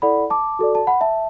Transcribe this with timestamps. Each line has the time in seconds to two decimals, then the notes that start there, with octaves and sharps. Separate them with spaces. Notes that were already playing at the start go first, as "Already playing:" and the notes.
0.02 E4 A4 D5 F#5 B5
0.30 A5 D6
0.59 F#4 A4 D5
0.75 A5
0.87 F#5 B5
1.01 E5 A5